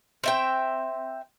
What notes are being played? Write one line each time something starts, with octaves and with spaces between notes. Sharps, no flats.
C4 E5 G5